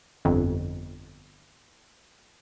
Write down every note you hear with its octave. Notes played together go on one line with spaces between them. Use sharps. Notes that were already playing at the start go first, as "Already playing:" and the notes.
G1 F2